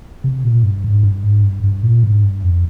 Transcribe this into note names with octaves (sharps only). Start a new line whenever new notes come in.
C3
A#2
G2
G#2
G2
G#2
G2
G2
A#2
G#2
G2
F2